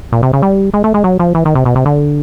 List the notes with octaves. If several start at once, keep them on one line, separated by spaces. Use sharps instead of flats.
A#2
C3
C#3
G3
G#3
A3
G#3
F#3
F3
E3
D#3
C3
B2
C3
D3